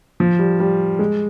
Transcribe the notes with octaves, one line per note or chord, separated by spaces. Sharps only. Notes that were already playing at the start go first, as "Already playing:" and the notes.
F3
G3
G3
G#3